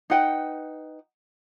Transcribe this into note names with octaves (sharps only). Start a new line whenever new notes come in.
D#4 B4 F#5 G5